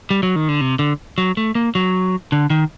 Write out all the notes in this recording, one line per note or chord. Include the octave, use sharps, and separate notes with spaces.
G3
F#3
D#3
D3
C3
D3
F#3
A3
A#3
F#3
D3
D#3